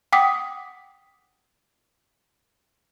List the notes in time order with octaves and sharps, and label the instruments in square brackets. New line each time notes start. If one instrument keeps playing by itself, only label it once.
[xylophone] F#5 G5 D6 D#6 B6